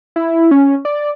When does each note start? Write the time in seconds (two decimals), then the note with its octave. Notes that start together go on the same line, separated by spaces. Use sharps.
0.16 E4
0.51 C#4
0.85 D5